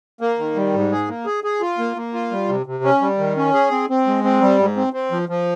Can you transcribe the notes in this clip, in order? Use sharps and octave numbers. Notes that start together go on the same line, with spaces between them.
A#3
D#3
G3
G#2
G#4
A#3
G#4
G#4
F4
A#3
A#3
F4
G3
C3
C3
C#4
G3
D#3
C#4
G#4
C4
C4
G#3
C4
G3
G#2
C4
C4
F3
F3